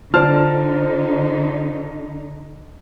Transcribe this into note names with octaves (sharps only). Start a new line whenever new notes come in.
D3 D#4 F4 C5 D5 A5 F6